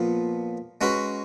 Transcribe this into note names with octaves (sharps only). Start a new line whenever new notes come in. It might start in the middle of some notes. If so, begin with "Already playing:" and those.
Already playing: A#2 F3 B3
G#3 C#4 F#4 B4